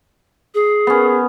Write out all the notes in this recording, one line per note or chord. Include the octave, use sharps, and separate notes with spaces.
G#4
B3 C#4